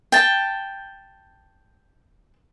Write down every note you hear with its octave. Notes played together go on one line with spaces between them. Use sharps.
G5 A5